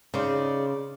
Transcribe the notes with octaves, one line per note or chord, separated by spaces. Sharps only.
C#3 D#4 C5 D5